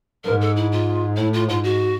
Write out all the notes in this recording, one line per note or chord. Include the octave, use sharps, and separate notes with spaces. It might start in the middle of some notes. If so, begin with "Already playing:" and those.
G#2 A#4
A4
E4
F4
A2 E4
F4
G#2 F4
F#4